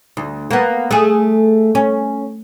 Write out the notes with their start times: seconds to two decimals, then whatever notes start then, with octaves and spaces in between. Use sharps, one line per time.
0.17 D2
0.51 A#3 B3
0.91 A3 G#4
1.75 C#4